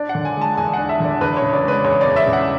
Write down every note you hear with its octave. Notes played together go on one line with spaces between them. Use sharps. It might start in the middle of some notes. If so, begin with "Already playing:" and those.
Already playing: D4 D5
F#5
D3
G#5
G#3
A5
E2 G#5
D4 F#5
E5
D3 D5
E2 B4
C#5
C#3
D5
G#3 B4
E2 C#5
D5
E2
E5
C#3
F#5